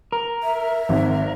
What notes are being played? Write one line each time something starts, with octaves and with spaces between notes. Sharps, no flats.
A#4
E5
G#1